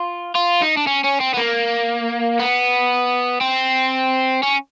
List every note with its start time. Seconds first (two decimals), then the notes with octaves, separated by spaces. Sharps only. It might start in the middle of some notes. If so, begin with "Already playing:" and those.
Already playing: F4
0.35 F4
0.62 D#4
0.77 D4
0.87 C#4
1.04 C#4
1.20 C4
1.34 B3
1.37 A#3
2.39 B3
3.41 C4
4.43 C#4